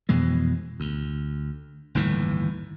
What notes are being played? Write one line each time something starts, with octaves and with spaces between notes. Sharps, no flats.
F2 B2 E3 G#3
D2
G1 D#2 A2 E3